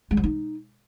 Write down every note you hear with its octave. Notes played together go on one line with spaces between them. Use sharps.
G#3
F3
D#4